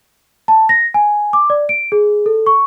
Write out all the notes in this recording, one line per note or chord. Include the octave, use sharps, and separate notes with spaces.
A5
A#6
G#5
D6
D5
D7
G#4
A4
C#6